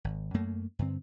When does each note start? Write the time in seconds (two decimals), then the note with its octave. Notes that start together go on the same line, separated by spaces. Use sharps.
0.04 G#1
0.34 F#2 A3 A#3
0.79 G2 D3 C4